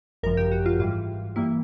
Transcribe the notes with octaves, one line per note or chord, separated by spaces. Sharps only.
G#1 F#2 C#3 F3 A#4
G4
F#4
F4
G#2 E3 G3 F4
G2 E3 G3 A#3 E4